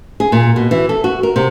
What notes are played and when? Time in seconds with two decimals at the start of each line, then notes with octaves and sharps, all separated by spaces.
0.20 G#4
0.32 A#2
0.56 B2
0.71 E3
0.89 A4
1.04 F#4
1.23 A#4
1.36 C3